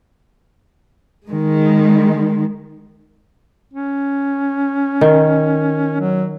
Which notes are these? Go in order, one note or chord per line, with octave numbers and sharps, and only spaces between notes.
D#3 G#3
C#4
D#3
F#3